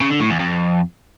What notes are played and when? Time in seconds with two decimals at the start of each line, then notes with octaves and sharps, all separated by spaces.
0.01 C#3
0.10 D3
0.20 A2
0.30 E2
0.40 F2